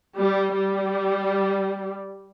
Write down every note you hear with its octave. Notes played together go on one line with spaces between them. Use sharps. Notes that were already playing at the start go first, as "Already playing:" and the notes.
G3
G3